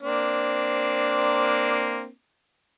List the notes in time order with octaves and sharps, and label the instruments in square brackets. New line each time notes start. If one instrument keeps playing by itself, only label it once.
[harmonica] A#3 C4 D4